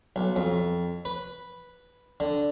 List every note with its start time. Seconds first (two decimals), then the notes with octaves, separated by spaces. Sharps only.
0.16 B1
0.36 F2
1.05 B4
2.20 D3